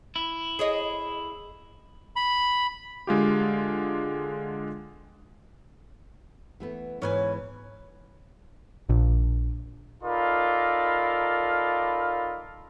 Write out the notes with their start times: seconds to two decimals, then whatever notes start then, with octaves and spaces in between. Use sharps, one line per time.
0.16 E4
0.59 G#4 C#5 D#5
2.16 B5
3.07 D3 G#3 F4 G4
6.60 E3 A3 B3
7.02 G#2 E3 B3 C#4 B4 G#5
8.89 A#1
10.02 D#4 F4 A4 A#4 D5 B5